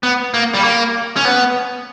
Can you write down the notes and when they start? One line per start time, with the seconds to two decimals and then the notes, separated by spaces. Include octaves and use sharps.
0.03 B3
0.34 A#3
0.54 G3
0.64 A#3
1.17 C#4
1.25 B3